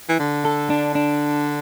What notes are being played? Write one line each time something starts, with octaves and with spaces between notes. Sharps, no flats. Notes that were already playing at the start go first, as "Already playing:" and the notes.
E3
D3
A4
D4
D4